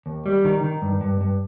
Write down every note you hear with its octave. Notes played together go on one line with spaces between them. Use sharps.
D#2
G3
D#3
D#3
G2
G2
G2